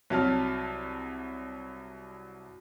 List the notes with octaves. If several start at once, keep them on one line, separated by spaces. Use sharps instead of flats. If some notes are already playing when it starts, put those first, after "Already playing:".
C2 F#3 A5 F6